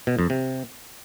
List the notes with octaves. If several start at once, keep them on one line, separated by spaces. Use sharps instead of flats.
B2
F2
C3